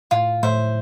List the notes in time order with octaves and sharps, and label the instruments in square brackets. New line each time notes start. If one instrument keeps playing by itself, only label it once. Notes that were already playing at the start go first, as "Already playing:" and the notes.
[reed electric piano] A2 [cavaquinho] F4
[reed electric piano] A2 [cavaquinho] C5 E5